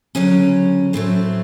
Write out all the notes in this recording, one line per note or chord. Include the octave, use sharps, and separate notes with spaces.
D2 C#3 F#3 C#4
A2 F#3 A3 C4